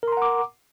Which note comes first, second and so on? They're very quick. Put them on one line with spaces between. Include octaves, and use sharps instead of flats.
A#4 C6 A#5 F#5 D6